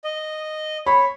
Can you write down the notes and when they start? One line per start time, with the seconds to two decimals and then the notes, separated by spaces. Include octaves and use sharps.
0.04 D#5
0.86 C#5 B5